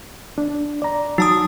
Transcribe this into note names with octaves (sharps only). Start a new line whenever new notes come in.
D4
D5 A#5
F#3 D#4 A5 D#6